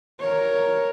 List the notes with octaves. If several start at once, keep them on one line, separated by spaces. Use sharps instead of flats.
A#4 C#5